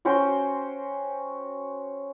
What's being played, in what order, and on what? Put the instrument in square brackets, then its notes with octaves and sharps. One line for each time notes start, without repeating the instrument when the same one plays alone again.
[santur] C#4 F#4 C5 G5